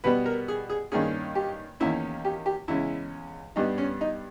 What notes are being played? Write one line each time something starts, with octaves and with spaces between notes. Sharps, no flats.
B2 G3 B3 B4
A#4
G#4
G#4
G2 D#3 A#3 C#4 G#4
G4
E2 D#3 A#3 C#4 E4
G4
G4
E2 C#3 G#3 C#4 E4
G2 G3 B3 D#4
C#4
D#4